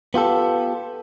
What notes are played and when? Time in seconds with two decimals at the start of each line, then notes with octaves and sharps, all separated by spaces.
0.14 B3 F4 G4 A4